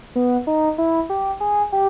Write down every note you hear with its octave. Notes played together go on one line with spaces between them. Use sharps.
B3
D#4
E4
G4
G#4
G4